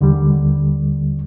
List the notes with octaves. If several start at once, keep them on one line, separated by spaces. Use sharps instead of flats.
D#2 D3 G3